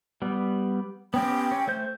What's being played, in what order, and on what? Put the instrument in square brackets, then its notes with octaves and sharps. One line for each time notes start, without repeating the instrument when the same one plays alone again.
[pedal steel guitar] G3 B3
[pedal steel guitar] B3 C#4 G4 [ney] G5
[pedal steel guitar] C#4
A3 C5 G6